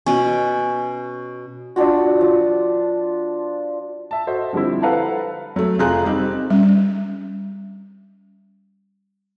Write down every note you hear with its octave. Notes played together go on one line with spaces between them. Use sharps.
B2 C#4
D4 F4 F#4
F3
E5 A5
F#4 A4 C5 D#5 E5
D3 F3 G3 C4 E4
A4 B4 F5 F#5 A5 A#5
F#3 A3
F1 F4 G#4 A#5 F#6
G3 C4 D#4
G3 C#4